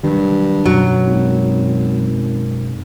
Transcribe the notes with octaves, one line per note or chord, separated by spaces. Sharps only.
G2 D#3 F#3
F#2 B2 F#3
G#1